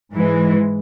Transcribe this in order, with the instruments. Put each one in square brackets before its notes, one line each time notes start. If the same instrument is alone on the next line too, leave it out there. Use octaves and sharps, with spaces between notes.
[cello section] G#2 E3 G#3